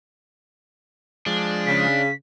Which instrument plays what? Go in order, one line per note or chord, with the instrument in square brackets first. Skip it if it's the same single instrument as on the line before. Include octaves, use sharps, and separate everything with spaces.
[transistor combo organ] F3 G#3 [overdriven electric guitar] D4
[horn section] C#3 [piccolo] B6